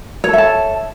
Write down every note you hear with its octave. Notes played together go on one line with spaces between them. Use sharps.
A4 C#5 E5 A5